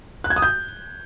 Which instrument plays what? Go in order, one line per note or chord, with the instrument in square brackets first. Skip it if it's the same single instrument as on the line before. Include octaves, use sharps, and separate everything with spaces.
[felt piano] F#6
G#6
D#6
G6